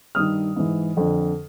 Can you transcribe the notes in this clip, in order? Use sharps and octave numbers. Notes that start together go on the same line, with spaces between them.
G2 D#3 D#6 F6
G#2 E3
F2 D3